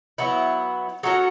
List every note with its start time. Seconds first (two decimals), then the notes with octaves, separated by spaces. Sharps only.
0.18 F#3 B3 E4
1.03 F#3 C#4 F#4 A4